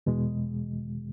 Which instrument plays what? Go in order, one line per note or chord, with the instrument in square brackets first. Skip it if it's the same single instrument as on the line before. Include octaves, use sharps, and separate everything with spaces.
[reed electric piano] E2 B2 G#3